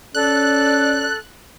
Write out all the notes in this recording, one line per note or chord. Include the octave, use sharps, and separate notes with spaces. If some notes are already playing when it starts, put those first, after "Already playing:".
C#4 A4 D5 F#6